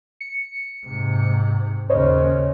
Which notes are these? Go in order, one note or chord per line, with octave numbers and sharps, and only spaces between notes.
C#7
G#2 C3
D#2 C#3 C5 C#5 D#5